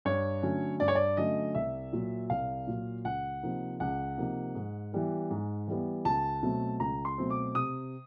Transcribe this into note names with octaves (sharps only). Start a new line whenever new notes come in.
G2 C#5
D3 F#3 A3 C#4
G2 D5
C#5
D5
D3 F#3 A3 C#4 D#5
C2 E5
A#2 F#3
C2 F5
A#2 F#3
C#2 F#5
C3 F3 A#3 D#4
C#2 F#5
C3 F3 A#3 D#4
G#2
E3 G3 B3
G#2
E3 G3 B3
C#2 A5
B2 F#3 A3 C4
C#2 A#5
C6
B2 F#3 A3 C4
D6
C3 D#6